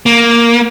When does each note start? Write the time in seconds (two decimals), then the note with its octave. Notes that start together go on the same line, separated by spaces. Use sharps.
0.06 A#3